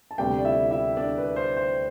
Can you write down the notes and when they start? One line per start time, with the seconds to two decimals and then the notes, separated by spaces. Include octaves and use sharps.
0.11 A5
0.18 D2 C3 G3 B3 G4 G5
0.39 D5
0.45 E4 E5
0.71 E4 E5
0.97 D4 D5
1.18 B4
1.36 C5
1.57 C5